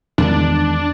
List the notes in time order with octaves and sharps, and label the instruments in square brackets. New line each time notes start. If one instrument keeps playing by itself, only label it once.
[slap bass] E2 D#3 G#3 [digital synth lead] D4